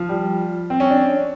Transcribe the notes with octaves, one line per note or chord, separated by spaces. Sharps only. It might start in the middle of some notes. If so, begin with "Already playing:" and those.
Already playing: F3
G3
C4
C#4
D4